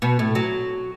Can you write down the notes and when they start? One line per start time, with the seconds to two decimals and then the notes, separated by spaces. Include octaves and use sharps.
0.02 B2
0.19 A2
0.35 F#3